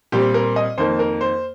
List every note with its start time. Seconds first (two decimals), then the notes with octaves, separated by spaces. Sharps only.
0.12 A#2 G3 C4 G4
0.34 A#4
0.56 D#5
0.78 F2 D#3 A#3 C5
0.99 A#4
1.21 C5